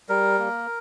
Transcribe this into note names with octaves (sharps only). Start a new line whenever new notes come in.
G3 A#4
A#3